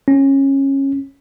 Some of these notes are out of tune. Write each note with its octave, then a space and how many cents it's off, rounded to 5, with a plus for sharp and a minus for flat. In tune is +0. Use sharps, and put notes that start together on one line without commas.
C#4 -20